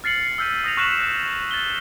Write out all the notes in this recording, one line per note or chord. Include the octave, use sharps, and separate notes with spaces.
F6 A6 C7 C#7 F#7
E6 F6 G6 B6 D#7
D#6 A#6 F7
C#6 F6 F#6 B6 E7 F#7
F6
A6 G7